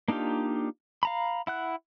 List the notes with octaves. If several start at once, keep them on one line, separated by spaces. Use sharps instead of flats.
A#3 D4 D#4 F4 G4
F5 A#5 B5
E4 F#5 F#6